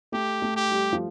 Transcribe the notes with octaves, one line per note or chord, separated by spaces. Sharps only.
A3 G4
A3
G4
G3
F3